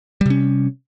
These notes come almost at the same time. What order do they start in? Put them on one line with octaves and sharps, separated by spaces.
G3 C3 C#4